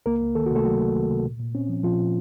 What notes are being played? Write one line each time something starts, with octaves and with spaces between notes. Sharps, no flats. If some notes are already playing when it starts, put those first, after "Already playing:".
C#2 A#3 A#4
C#2
D#3 A4
F#4
C3 A3 A4
C#2 F#3 F#4
C#2
D#3
C3
A#2
A#2
C4 C#4
F3
A#2 F3 F4
A#2